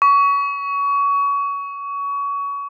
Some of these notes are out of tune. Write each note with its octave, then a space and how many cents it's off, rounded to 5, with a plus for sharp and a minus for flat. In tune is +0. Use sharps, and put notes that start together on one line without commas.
C#6 +25